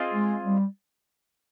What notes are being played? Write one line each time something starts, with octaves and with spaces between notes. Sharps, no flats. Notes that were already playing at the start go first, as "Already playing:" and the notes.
Already playing: C4 F4 G#4 D#5
G#3
G3